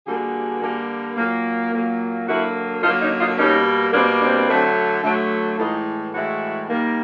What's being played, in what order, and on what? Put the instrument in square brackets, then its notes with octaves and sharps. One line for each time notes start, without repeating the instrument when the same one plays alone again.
[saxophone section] D3 G3 A#3 F#4 G#4
D3 G3 A#3
A#2 F#3 A#3
A#2 F#3 A#3
D3 F#3 A#3 E4 F#4
D3 F#3 A#3 D#4 F4
C#4 D#4
D#4 F4
B2 G3 A#3 C#4 D#4
B2 G3 A#3 C4 D4
C4 D4
D3 F#3 A3
D3 F#3 A3
A2 E3 G#3 D#4 F4
A2 E3 G#3 E4 F#4
D#3 G3 A#3